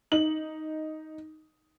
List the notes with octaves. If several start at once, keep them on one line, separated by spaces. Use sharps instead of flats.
D#4 F#7